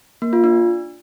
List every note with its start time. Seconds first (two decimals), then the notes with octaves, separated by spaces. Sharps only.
0.22 A#3
0.33 F4
0.44 D4